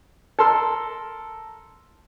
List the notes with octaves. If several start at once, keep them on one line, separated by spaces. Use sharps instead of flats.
A4 A#4 C6 E6